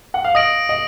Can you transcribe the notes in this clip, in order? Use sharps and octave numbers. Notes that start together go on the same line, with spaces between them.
F#5
F5
D#5 D#6 A#6 D7 F#7
D#5